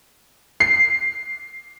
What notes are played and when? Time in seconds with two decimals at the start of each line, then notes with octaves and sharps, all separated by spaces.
0.60 C7